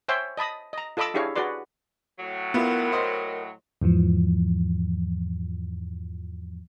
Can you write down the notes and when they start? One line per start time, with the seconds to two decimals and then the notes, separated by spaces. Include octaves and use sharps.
0.09 C5 C#5 E5 G5 G#5 C6
0.37 D#5 A5 B5 D#6
0.73 D#5 A#5
0.97 F4 A4 D#5 B5 D6 E6
1.14 D4 E4 G4 G#4 C#5 F5
1.35 F#4 G#4 B4 D5 C6
2.19 A2 F#3
2.54 B3 E4 F4 A#4
2.92 C5 D#5 C6
3.82 E2 G#2 E3 F3